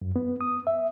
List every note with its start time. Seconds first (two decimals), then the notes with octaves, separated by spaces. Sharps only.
0.02 F#2
0.16 B3
0.41 D#6
0.67 E5